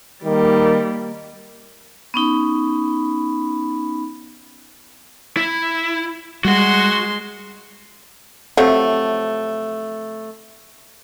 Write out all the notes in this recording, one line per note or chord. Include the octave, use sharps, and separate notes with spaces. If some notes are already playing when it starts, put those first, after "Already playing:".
D#3 G3 A#3
B3 C#4 D#4 B5
E4
G3 G#3 F#4 F#5 C6
C3 F3 F#3 A3